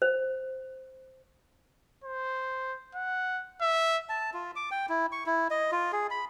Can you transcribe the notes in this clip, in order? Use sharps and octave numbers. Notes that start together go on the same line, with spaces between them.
C5
C5
F#5
E5
A5
F4
D6
G5
E4
C#6
E4
D#5
F4
G#4
B5